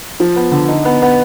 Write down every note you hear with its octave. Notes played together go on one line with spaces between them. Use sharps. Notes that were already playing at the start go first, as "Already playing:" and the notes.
F3
B3
D3
D#4
B3
B3